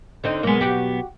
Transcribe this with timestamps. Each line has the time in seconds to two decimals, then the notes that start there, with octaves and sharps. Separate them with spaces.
0.24 D3 C4 D#4
0.43 B1 G#3 A#3 B3
0.61 F#4 G4